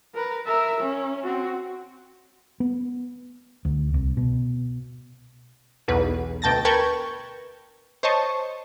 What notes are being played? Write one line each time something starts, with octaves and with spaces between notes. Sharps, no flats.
A#4 B4
A#4 E5
C#4
C4 F#4
B3
D2
C2
B2
B1 E2 B4
D2 B2 G5 A5 A6 A#6
A#4 B4 G5 A5 C#6 G#6
C5 C#5 D#5 A5 C#6